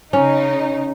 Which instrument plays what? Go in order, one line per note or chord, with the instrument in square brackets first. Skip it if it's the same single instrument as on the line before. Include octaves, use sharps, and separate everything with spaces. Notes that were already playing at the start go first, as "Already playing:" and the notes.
[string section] C#3 D#4 [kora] C#4